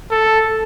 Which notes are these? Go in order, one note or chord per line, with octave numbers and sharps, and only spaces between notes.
A4